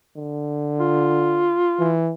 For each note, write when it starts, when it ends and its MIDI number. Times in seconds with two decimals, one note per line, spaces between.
0.16 1.60 50
0.80 1.95 65
1.79 2.13 52